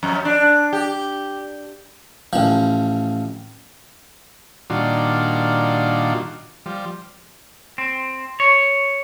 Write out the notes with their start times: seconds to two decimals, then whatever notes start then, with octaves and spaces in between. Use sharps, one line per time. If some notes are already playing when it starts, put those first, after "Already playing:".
0.03 F2
0.25 D4
0.73 G4
2.33 A1 F3
4.70 A#2 D#3 G3 D4 F4 F#4
6.66 F3 G3
7.78 C4
8.40 C#5